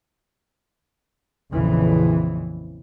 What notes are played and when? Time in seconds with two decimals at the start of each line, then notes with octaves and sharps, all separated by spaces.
1.53 A#1 F2 C#3 E3